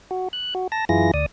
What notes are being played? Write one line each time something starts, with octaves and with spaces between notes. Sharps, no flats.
F#4
F#6
F#4
A5 A#6
F#2 E3 E4 F4 G#4 A#6
D2 D5 D#6